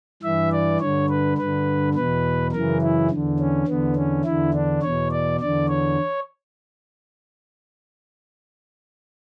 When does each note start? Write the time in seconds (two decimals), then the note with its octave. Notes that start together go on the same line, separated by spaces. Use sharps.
0.23 G2 E3 E5
0.52 D5
0.80 G2 D3 C#5
1.09 B4
1.38 G2 D3 B4
1.95 E2 B2 B4
2.52 F#2 C#3 E3 A#4
2.82 E4
3.11 E2 D3
3.39 C#4
3.68 E2 D3 B3
3.96 C#4
4.25 E2 D3 E4
4.54 D4
4.82 E2 B2 C#5
5.11 D5
5.40 E2 D3 D5
5.68 C#5